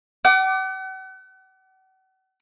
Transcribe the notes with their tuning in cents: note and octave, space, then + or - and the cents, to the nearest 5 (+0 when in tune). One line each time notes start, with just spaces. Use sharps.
F#5 +40 D6 +0